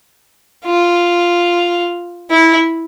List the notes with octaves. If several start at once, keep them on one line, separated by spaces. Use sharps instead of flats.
F4
E4